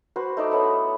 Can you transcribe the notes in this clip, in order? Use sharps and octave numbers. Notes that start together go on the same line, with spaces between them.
F#4 B4 C5
A3 D#4 E4 D5
B3 A4 C#5 E5